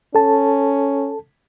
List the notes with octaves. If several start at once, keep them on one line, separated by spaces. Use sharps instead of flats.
C#4 A4 A5